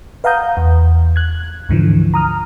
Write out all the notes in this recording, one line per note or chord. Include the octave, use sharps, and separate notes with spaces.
B4 F5 F#5 A#5 D#6 G6
E2
F#6 G#6
D2 G#2 D3 E3 F3
A#5 D#6 F6